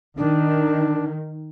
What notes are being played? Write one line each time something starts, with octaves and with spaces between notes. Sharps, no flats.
D#3 D4